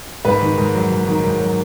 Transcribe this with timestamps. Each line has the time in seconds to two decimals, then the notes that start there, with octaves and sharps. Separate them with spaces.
0.25 G#2 B4
0.41 D#3
0.58 G#2
0.74 F#3
0.91 G#2
1.07 D#3
1.24 G#2
1.40 F#3